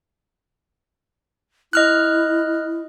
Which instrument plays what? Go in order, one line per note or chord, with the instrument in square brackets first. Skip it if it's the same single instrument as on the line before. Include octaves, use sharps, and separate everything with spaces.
[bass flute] E4 [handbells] D#5 F6 F#6